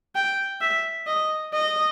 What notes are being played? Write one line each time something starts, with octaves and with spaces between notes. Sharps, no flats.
G5
E5
D#5
D#5